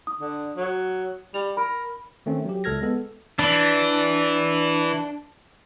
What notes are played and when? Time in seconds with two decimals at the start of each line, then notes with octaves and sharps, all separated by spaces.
0.07 D#6
0.21 D3
0.57 F#3
1.34 G3 F7
1.57 A#4 B5
2.26 D#3 A3 C4 C#4
2.45 F#3 G4
2.64 C#2 A4 F6 G#6 A#6
2.82 G#3 B3 A4
3.39 E3 D4